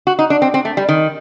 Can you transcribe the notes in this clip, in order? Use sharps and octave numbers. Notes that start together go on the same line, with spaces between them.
F#4
D#4
D4
C4
C4
A3
G3
D#3